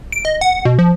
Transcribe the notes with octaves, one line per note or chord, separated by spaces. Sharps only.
D7
D#5
F#5
B2
F3